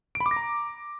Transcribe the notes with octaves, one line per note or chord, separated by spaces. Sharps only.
D7
B5
D6
A#6
A#5